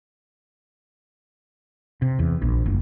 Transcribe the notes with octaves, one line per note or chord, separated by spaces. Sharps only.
C3
E2
A#1
F#1